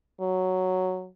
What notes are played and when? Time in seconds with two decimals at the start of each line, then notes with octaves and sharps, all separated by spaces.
0.21 F#3